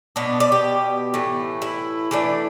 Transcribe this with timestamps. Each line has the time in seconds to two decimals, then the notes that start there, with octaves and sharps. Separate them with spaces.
0.16 B2 B3 D4
0.40 D5
0.52 G4
1.14 A2 E3 A3
1.62 E4
2.11 E3 A3 D4